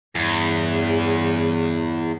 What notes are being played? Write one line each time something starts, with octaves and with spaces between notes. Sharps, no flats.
E2 G2 C#3